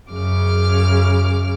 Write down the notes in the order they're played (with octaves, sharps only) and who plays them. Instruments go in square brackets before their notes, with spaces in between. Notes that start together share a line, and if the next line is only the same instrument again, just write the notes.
[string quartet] F#2 C#3 D6 F6